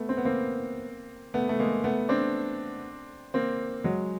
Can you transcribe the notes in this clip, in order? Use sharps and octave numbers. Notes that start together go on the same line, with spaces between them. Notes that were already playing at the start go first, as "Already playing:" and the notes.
Already playing: A3 B3
C4
B3
A#3 C4
A3 B3
A3
G#3 A#3
A3 B3
C4 D4
A#3 C4
F#3 G#3